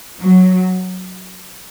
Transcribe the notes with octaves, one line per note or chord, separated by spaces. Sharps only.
F#3